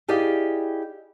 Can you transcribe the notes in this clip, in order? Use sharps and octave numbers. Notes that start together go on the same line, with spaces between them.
E4 G4 G#4 D5 D#5 F5